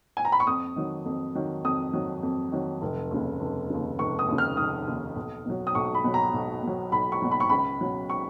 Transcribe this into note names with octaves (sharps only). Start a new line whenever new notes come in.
G#5
A#5
B5
C#6
F2 D#6
D#3 F#3
F2
D#3 F#3
F2 D#6
D#3 F#3
F2
D#3 F#3
F1
D#2 C#3
F1
D#2 C#3
F1 C#6
D#6
D#2 C#3
F6
F1 D#6
D#2 C#3
B1
B2 F#3
D#6
B1 C#6
B5
B2 F#3
A#5
B1
B2 F#3
B1 B5
C#6
B2 F#3
B5
C#6
C#2 B5
B2 F#3
C#6